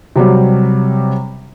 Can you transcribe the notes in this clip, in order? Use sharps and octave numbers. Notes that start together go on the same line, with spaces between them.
C3 F#3 G3